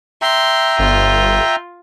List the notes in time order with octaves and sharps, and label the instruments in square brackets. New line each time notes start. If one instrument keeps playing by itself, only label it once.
[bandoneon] E5 G5 A#5 [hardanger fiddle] C6
[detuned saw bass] G1 [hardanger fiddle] F4